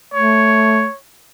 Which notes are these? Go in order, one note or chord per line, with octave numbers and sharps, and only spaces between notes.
A3 C#5